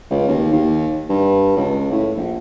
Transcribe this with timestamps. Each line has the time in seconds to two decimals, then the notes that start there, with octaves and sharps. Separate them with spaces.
0.11 C#2
0.28 D#2
0.53 D#2
1.10 G2
1.57 C#2
1.92 A2
2.16 A#1